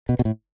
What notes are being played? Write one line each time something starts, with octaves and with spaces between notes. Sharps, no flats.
B2
B2
A2